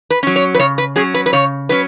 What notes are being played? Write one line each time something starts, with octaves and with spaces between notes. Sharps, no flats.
B4
F#3 C#4
C#5
B4
C#3 C#5
B4
F#3 C#4 G#4
B4
B4
C#3 C#5
F#3 C#4 B4